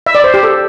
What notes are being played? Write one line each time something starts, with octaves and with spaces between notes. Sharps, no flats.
E5
D5
C5
G4
A4